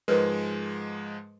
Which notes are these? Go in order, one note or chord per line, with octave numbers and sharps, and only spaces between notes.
G#2 F3 G#3 A#4 B4 C#5